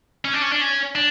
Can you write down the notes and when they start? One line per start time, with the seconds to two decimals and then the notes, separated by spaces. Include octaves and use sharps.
0.25 C#4
0.33 D4
0.42 C#4
0.52 D4
0.61 C#4
0.95 D4